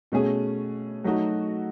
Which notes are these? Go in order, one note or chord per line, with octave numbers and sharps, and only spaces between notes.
B2 A3 C#4 G#4
F#3 A3 D#4 F#4